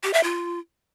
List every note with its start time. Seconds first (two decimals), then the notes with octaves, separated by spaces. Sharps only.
0.04 G4
0.13 E5
0.23 F4